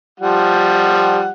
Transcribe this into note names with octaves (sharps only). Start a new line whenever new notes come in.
F3 G3 F#5